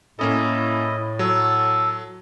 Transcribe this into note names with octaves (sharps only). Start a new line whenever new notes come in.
A2 A#3 C#4 E4 A4 D#5
F#3 A4